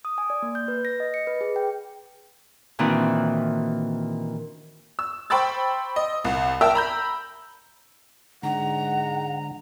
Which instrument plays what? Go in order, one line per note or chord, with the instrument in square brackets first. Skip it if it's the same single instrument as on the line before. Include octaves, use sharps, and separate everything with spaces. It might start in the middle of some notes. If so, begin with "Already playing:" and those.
[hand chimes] D#6
G#5
D5
A#3
G6
B4
A#6
D#5
C#7
B4
G#4
G5
[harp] A#2 D#3 E3 C4 D4 F#4
[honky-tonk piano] E6
C5 G5 B5 C#6 E6 A6
D#5
C2
A#4 E5 G5 A5 A#5 E6
A#5 B5 G6
[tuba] G#2 [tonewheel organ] D3 [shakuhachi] F#5 [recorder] A#5